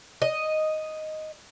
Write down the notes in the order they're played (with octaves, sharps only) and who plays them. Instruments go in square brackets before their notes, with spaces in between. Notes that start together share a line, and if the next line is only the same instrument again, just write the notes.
[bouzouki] D#5